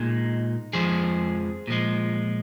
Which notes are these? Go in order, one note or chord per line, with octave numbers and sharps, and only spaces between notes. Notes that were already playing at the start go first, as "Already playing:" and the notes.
Already playing: A#2 G#3 D#4
F2 F3 G#3 G#4 C5
A#2 F3 G#3